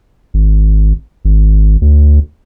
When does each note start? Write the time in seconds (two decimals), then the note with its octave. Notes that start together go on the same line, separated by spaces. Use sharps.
0.34 G#1
1.25 G#1
1.82 D2